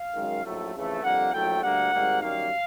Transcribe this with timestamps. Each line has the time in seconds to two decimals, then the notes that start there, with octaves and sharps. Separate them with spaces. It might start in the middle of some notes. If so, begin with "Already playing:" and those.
Already playing: F5
0.15 F#2 D#3 G#3
0.44 A#1 A2 F#3 A3
0.74 F2 C#3 E3 A3
1.03 F2 D3 G3 A#3 F#5
1.33 A#1 A2 F#3 A3 G5
1.62 D2 D3 G3 A#3 F#5
1.92 G#1 G#2 D#3 G3 A#3
2.21 F#2 D#3 G3 A#3 F5